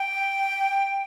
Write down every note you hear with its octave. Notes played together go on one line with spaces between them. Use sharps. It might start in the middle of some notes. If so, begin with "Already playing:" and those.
Already playing: G5